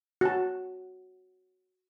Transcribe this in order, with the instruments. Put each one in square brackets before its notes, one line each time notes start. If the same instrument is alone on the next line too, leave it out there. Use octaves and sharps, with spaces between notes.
[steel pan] F#4 A5